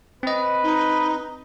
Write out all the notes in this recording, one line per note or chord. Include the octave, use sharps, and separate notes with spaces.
C4 B4 D#5
D#4